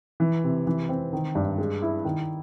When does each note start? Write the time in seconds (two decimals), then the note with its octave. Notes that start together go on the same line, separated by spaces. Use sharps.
0.20 E3
0.44 C3
0.67 E3
0.89 C4
1.13 D#3
1.35 G2
1.58 G#3
1.82 E4
2.05 D#3